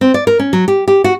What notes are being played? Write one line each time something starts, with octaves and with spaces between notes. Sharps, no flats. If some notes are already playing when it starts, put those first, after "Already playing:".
C4
D5
A#4
C#4
F#3
G4
G4
F#4